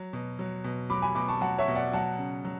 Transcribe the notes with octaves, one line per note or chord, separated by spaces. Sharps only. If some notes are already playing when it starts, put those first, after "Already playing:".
Already playing: F#3
B2
F#3
B2
F#3 B5 D6
G#5 B5
B2 B5 D6
A5 C#6
F#3 F#5 A5
C#5 E5
B2
D5 F#5
F#3 F#5 A5
C#3
F#3